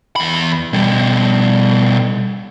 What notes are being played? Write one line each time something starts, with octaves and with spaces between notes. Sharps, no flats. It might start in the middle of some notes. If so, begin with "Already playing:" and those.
E2 B5
B2 G3